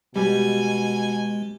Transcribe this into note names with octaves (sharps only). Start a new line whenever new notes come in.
B2 G3 G#3 G#5